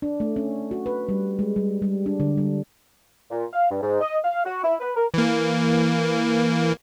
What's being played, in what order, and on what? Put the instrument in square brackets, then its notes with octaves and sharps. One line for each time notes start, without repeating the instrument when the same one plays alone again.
[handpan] D4
A3
C#4
F#4
B4
G3
G#3
G3
G3
D4
D3
G3
[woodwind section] A#2
F5
G2
G#2
D#5
F5
F#4
E4
B4
A#4
[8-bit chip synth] E3 A#3